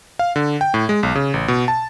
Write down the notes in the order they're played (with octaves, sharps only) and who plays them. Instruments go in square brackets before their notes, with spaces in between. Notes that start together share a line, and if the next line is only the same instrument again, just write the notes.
[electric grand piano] F5
D3
G5
A2
G#3
B1
C#3
A1
B2
A5